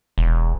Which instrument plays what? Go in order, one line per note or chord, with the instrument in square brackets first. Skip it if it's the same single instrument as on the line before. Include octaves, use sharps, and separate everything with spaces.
[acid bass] E1